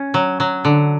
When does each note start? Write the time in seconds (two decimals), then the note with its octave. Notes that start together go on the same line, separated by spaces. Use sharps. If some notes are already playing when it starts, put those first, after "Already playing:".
Already playing: C#4
0.14 F#3
0.40 F#3
0.65 D3